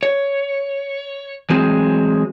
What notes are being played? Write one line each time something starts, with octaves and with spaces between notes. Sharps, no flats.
C#5
E3 F#3 G#3 C4